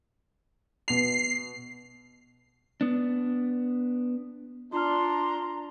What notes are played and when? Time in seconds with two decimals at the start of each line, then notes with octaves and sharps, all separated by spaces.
0.88 B2 C7 F7
2.81 B3 D4
4.72 D4 F4 A#5 C6 F6